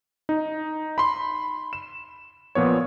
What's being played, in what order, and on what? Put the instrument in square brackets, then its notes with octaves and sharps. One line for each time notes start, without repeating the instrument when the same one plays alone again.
[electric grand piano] D#4
B5 C6
E7
A#2 F3 B3 C#5